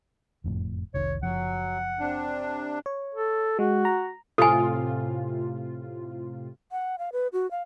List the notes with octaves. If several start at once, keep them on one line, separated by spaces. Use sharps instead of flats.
F#1 F2 A2
F1 C2 D#3 C#5
F#1 F3 F#3 F#5
C3 D4
C#5
A4
G#3 F#4
A#5
A2 C3 F4 A4 G#5
F#5
F5
B4
F#4
F5